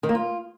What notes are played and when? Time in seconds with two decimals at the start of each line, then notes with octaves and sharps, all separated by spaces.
0.03 D#3
0.09 A#3
0.15 F4